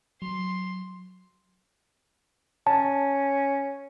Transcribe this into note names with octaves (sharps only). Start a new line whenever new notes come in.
F#3 C6
C#4 A5